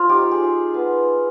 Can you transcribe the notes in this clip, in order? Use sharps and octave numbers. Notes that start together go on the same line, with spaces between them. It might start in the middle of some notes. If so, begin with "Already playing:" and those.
Already playing: F4 C5
D#4 G4
G#4
D#4
B3 B4